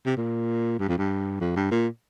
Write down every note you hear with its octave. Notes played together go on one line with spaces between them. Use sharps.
C3
A#2
G2
F2
G2
F2
G2
A#2